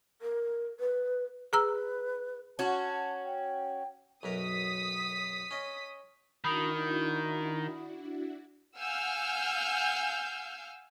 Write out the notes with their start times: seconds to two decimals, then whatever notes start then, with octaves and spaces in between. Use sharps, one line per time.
0.22 A#4
0.80 B4
1.53 G#4 B4 A#5 E6
2.59 C#4 F#4 A5
3.25 G5
4.23 B1 F#2 A#4 D#6 B6
5.51 C#4 D#5
6.44 D#3 D4 E4 F#4 B5 D#6
8.78 F5 F#5 G#5 E6 F6 G6